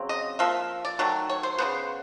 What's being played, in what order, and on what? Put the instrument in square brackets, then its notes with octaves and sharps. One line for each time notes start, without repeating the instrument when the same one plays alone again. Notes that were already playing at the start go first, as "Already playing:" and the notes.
Already playing: [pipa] C#3 F#3 C4
D#5
F3 A#3 E5
D5
D#3 F#3 A3
C#5
C5
C#3 F#3 B3 C5